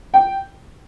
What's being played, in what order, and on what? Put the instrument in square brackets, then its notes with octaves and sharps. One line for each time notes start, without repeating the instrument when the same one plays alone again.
[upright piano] G5